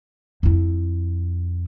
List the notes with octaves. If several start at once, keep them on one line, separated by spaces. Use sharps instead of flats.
F2 E4